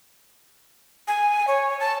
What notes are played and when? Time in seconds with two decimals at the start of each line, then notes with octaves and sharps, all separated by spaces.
1.08 G#5
1.48 C#5
1.80 A5